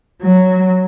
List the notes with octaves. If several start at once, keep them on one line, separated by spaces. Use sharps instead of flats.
F#3